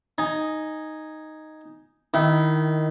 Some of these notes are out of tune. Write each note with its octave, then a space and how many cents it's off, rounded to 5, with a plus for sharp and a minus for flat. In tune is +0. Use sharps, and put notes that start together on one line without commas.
D#4 +0 G#5 +0
D#3 +0 E4 -10 G5 -40